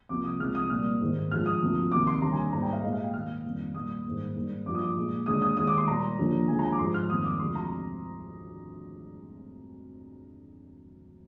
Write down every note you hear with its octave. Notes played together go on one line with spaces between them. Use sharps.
C2 C3 F3 A#3 D6
D#6
C2 C3 F3 G#3 F6
D#6
A#2 G3 A#3 F6
G#2 D#3 A#3
G2 F3 G#3 F6
D#6
D2 C3 F3 A#3
C2 C3 D#3 A#3 D6
C6
D#2 D3 G3 A#3 A#5
G#5
G#2 G3 A#3 A#5
G5
F5
A#2 G#3 D#5
F5
G5
D#2 D#3 A#3 F6
F2 D#3 G3 A#3
A#2 G3 A#3 D#6
G#2 D#3 G3 A#3
G#2 G3 A#3
G2 F3 A#3 D6
D#6
D6
A#2 G#3
D#2 D3 G#3 D#6
D#6
D#2 D#3 G#3 D#6
D6
C6
A#2 G3 A#3 A#5
D#2 D3 F3 A#3
D#2 D3 F3 G#3 G#5
A#5
G#5
D6
G#2 F3 G#3 C6
F6
F2 D#3 G3 A#3 D#6
D6
D2 C3 F3 G#3 C6
A#5